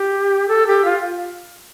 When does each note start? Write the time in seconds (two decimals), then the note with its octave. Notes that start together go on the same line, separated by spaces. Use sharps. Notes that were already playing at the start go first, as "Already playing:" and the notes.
Already playing: G4
0.48 A4
0.67 G4
0.85 F4